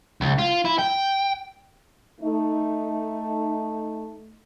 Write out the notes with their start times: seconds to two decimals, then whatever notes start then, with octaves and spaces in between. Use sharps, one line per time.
0.21 C#2
0.39 F4
0.65 E4
0.79 G5
2.21 A3 D#4